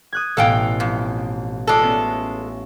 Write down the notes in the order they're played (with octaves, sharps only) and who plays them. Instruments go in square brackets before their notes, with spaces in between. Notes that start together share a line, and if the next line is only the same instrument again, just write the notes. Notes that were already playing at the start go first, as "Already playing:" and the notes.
[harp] D#6 F#6 G#6
[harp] A1 B2 [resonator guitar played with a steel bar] A4 F5 G5
[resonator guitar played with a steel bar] F2
[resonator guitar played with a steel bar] G#3 A4 [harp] F4 D5 E5
[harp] B3 C#4